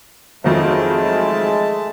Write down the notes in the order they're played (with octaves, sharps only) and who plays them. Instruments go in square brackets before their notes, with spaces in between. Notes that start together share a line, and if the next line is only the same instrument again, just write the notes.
[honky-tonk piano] F2 D#3 F#3 [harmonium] G#3 A3 A5